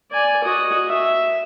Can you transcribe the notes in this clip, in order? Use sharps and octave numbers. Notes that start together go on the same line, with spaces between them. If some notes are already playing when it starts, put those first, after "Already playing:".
D5 G#5
F#4 D#5
E5